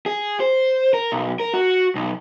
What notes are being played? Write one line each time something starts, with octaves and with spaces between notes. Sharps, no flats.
G#4
C5
A#4
B1
A#4
F#4
B1